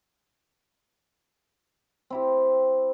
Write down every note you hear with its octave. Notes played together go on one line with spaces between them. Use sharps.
C4 E4 G4